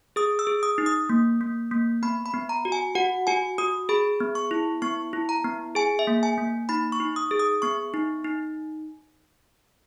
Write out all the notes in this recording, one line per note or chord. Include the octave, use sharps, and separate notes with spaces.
G#4 D#6
E6
G#4
D#6
D#4
D#6
A#3
A#3
A#3
B3 B5
B5
B3
A#5
F#4
G#5
F#4 F#5
F#4 G#5
F#4 D#6
G#4 B5
B3
C#6
E4
B3 C#6
E4
A#5
B3
G#4 G#5
E5
A#3
G#5
A#3
D#4 B5
C#6
D#4
D#6
G#4
D#6
B3 C#6
D#4
D#4